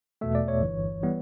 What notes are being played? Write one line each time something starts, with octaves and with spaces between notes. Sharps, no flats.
E2 B2 A3 E5
D5
C#5
G1 G2 E3
E3 G3 B3